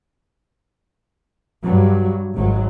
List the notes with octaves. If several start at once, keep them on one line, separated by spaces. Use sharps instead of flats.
G2 F#3
G#1 F#3